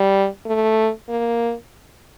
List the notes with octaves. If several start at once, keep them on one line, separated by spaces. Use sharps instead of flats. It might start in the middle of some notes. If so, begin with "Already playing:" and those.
Already playing: G3
A3
A#3